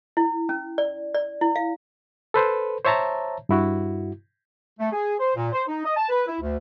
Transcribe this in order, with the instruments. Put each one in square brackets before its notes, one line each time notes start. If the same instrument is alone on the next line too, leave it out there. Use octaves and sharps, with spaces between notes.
[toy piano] E4
C#4
D5
D5
E4
F5
[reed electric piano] A4 B4 C5
C5 C#5 E5 A5 A#5
G2 E4 F#4
[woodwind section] A3
G#4
C5
A#2
C5
D#4
D#5
A5
B4
E4
D2